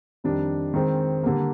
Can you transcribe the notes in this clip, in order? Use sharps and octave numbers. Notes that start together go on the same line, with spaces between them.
F2 D#3 G3 D4
D#3 G#3 C4
D3 G3 A#3